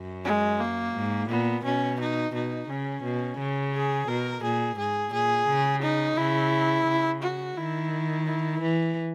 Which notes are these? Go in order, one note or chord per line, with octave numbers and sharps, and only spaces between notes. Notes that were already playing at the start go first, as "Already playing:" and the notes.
Already playing: F#2
G#3
A#3
G#2
A#2 B3
B2 C#4
D#4
B2 D#4
C#3 C#4
B2
C#3
G#4
B2 A#4
A#2 G#4
G#2 G#4
A#2 G#4
C#3
D#4
C#3 E4
C#3
F#4
D#3 E4
E4
E3